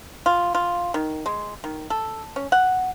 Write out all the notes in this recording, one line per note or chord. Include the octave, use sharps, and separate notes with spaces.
F4
F4
D#3
G#3
D#3
A4
C#4
F#5